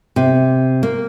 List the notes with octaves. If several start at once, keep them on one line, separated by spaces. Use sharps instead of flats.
C3
A#3